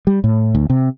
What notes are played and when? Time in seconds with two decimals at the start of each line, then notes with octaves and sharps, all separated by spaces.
0.07 G3
0.24 A2
0.55 D2
0.70 C3